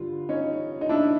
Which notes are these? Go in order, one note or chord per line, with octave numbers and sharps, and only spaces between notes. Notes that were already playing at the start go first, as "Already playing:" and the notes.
Already playing: G2 D3 G3 F4
C#4 D#4
D#4
D4 E4